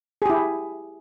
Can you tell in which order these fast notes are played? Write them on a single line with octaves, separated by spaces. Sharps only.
G#4 G4 E4